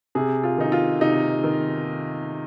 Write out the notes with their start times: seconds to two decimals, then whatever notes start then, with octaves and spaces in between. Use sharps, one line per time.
0.15 C3 G#4
0.43 F4
0.58 D#3 D#4
0.72 F4
1.01 C3 D#4
1.44 D#3